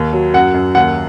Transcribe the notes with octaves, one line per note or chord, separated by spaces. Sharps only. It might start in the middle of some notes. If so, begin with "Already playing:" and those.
Already playing: D#2
F#3
F#2 F#5
F#2
D#2 F#5